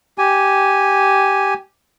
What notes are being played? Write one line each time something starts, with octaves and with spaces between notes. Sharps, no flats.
G4 G#5